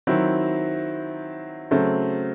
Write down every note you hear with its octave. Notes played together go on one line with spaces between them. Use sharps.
D#3 F#3 C4 E4
C#3 F#3 A3 C4